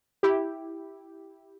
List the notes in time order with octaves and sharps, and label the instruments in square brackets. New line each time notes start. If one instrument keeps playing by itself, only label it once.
[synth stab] E4 G4